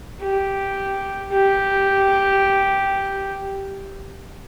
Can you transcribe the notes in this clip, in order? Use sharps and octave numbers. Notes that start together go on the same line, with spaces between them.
G4
G4